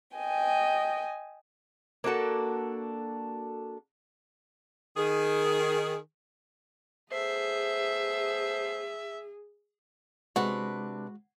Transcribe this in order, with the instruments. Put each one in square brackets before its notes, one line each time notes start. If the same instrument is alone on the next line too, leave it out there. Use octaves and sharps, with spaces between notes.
[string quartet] D#5 G5 G#5
[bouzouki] A#3 D4 F#4 A4
[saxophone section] D#3 G#4
[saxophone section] A3 B3 C5 [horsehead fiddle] G#4 [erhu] E5
[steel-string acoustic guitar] C3 D4 B4 [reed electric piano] G#3 [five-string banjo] F#4